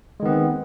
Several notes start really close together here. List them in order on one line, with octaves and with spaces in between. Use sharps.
G#3 D#3 B3 C4